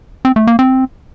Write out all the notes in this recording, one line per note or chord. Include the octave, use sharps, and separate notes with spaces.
C4
A3
A#3
C4